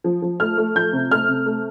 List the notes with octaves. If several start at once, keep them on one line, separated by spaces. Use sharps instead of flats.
F3
F3
A3 F6
A3
F3 G6
C3
A3 F6
C3
A3